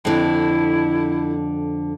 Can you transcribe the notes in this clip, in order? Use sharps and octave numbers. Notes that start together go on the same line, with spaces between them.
F2 D3 E4